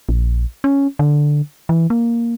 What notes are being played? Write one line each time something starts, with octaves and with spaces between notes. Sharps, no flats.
A#1
C#4
D3
E3
A#3